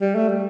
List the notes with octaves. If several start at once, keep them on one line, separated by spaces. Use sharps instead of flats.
G3
A3
G3